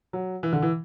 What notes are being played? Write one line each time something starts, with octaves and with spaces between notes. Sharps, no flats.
F#3
E3
D3
E3